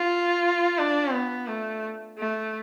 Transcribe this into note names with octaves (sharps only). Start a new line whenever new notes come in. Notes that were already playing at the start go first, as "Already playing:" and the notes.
Already playing: F4
D4
B3
A3
A3